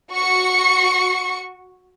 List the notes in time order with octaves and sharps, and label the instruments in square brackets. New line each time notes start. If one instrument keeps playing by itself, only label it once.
[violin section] F#4 C#6 C#7